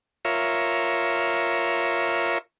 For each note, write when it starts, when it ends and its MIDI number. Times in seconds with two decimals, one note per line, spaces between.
0.25 2.38 65
0.25 2.38 70
0.25 2.38 73
0.25 2.38 76